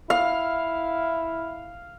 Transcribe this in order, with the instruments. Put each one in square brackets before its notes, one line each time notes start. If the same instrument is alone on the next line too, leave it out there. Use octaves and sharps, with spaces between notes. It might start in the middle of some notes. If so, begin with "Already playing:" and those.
[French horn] E4 [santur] F5